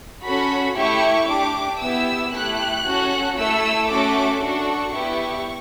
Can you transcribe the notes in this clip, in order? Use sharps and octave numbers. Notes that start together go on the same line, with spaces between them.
C#4 F#4 A4 B5
A3 E4 G4 C#6
D4 G4 D6
B3 E4 G4 E6
A3 E4 G4 F#6
C#4 F#4 A4
A3 E4 A4 E6
A3 C#4 F#4 A4 D6
D4 F#4 A4 C#6
B3 E4 G4